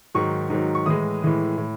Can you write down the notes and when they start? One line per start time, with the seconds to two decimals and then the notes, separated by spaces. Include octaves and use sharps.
0.14 G#2 D#3 F#3 C#6
0.50 G#2 D#3 F#3
0.75 C#6
0.86 A2 E3 G#3 D#6
1.22 A2 E3 G#3
1.58 A2